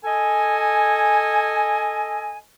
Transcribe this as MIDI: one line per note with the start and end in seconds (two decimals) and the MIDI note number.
0.05 2.39 69
0.05 2.39 75
0.05 2.39 80